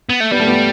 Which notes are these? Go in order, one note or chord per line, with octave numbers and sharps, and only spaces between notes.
B3
A3
G3 B3
A3
B3